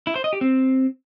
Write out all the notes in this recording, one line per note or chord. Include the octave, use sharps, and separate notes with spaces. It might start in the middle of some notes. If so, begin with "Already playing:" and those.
E4
C5
D#5
G4
C4